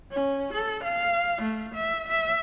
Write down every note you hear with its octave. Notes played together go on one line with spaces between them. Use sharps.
C#4
A4
F5
A3
E5
E5